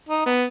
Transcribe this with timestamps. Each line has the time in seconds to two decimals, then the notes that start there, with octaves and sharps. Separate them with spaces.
0.09 D#4
0.26 B3